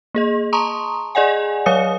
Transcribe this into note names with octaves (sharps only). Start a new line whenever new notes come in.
A#3 G#4 D#5
A5 A#5 C6 C#6 D#6
G#4 D5 D#5 F#5 G#5
F#3 C#5 F5 D#6 C#7